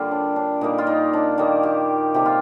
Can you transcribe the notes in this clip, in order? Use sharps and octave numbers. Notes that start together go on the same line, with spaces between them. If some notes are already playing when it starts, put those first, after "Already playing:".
Already playing: D3 G3 A#3 F4
D4
D4
A#2 G3 A#3 D#4
F4
D#4
D4
D#3 G3 A#3 D#4
G4
C3 F3 A#3 G4
F4